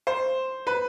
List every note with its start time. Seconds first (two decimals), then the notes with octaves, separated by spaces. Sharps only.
0.07 C5
0.67 B4